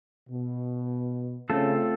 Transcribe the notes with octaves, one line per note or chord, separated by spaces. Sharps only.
B2
C#3 A3 C4 F4 A4